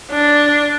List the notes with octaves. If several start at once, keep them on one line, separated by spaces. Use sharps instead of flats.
D4